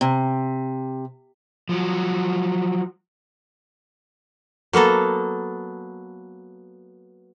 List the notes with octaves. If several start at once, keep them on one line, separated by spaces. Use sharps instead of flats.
C3
F3 F#3
F#3 A#3 B3 A4